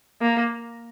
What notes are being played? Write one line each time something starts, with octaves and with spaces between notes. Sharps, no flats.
A#3